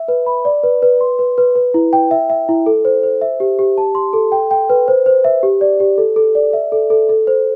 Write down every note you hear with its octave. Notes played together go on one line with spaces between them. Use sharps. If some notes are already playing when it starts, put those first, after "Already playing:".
Already playing: E5
B4
B5
D5
B4
B4
C6
B4
B4
B4
E4
G5
E5
E5
E4
A4
C5
C5
E5
G4
G4
A5
C6
A4
G5
G5
B4
C5
C5
E5
G4
D5
G4
A4
A4
D5
E5
A4
A4
A4
C5